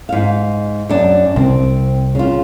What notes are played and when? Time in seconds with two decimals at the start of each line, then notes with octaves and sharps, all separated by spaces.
0.09 G#2 F5
0.89 F#2 D4
1.36 C2 C4
2.15 C#3 F4